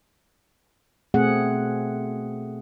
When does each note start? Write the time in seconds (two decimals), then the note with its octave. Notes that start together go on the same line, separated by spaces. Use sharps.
1.14 B2 A3 C4 G#4 F#5